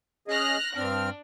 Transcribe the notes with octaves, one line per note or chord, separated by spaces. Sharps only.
C#4 G#4 D#5 F6 F#6 A#6
G2 C4 D4 F6